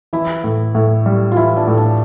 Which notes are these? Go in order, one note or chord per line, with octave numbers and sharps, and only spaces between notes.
E3 E4
A2
A2
G3
E3 E4 F4
D4
A2
D4